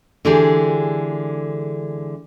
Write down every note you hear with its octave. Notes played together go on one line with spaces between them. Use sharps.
D3 E3 G#3 D4 G4 G#4